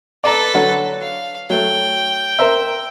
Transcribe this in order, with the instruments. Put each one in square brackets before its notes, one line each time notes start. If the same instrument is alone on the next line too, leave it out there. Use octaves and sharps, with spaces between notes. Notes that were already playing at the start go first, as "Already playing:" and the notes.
[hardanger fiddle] A4 B4 [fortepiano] D5 A#5
[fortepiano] D3 F#3 F#4
[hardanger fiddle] F5
[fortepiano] F#3 A3 [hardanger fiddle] G5
[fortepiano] A#4 C5 E5